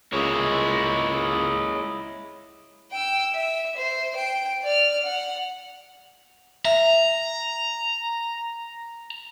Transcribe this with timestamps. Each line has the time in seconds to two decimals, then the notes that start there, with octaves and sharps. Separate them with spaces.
0.13 C#2 G#3 A#3 E4 C#5 D#5
2.91 G5 E6
3.34 E5
3.77 C5
4.16 G5
4.64 D5 F6
5.03 F#5
6.65 E5 A#5